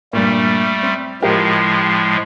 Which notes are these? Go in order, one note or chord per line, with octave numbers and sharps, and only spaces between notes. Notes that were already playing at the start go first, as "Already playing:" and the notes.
G2 A#2 G3 A3
C4
A2 F3 G#3 F4 G4 A#4